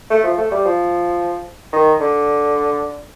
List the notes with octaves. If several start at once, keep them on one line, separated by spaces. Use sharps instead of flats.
A3
F3
A3
G3
F3
D#3
D3